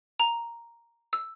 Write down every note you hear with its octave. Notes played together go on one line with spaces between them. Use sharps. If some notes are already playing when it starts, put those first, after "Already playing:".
A#5
E6